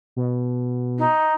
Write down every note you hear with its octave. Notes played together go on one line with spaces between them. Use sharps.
B2
D#4